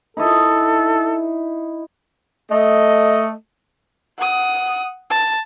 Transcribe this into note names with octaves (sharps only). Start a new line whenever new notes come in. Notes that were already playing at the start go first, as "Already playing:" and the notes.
D#4 E4 A4 D#5
A3 D#5
F#5 D#6
A5